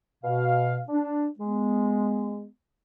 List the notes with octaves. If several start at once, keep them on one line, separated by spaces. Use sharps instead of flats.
B2 F5
D4
G#3 B3